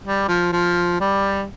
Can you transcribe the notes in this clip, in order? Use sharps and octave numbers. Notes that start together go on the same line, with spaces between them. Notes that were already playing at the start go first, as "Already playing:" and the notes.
G3
F3
F3
G3